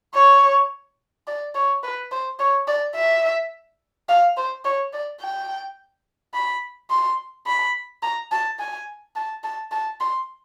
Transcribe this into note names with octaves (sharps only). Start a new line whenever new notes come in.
C#5
D5
C#5
B4
C5
C#5
D5
E5
F5
C5
C#5
D5
G5
B5
C6
B5
A#5
A5
G#5
A5
A5
A5
C6